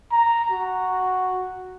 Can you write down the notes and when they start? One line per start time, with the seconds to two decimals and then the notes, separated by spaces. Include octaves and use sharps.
0.12 A#5
0.51 F#4